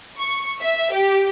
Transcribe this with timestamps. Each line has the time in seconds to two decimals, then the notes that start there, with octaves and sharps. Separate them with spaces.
0.18 C#6
0.61 E5
0.93 G4